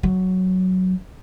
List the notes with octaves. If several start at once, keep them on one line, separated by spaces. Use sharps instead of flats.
F#3